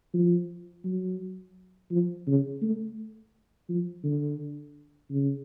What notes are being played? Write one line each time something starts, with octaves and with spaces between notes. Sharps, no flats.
F3
F#3
F3
C#3
A3
F3
D3
C#3